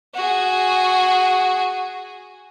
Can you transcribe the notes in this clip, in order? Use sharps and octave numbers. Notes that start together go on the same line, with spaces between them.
F#4 G#4